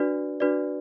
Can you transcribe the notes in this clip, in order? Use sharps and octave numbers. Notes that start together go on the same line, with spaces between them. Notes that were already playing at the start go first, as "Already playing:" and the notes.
Already playing: D4 F#4 B4 D5
D4 F#4 B4 D5